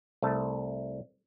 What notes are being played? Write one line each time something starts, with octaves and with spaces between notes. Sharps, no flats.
C2 A3 A5